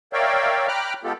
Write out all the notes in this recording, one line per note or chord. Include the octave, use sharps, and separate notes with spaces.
A#4 C#5 D5 E5 F5 G5
G5 A#5 B5 D6 F6 F#6
G#3 B3 F4 G4 A4